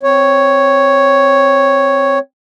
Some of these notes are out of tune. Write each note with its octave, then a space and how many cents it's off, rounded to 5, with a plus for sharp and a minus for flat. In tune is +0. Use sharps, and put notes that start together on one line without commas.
C4 +0 C#5 +0